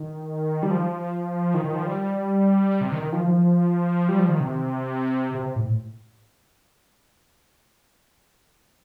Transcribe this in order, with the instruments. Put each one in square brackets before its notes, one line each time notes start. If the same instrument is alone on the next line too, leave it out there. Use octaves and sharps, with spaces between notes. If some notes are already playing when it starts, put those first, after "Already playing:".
Already playing: [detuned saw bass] D#3
G3
F3
D#3
D#3
F3
G3
C3
D#3
D#3
F3
F3
G3
F3
D#3
C3
C3
A2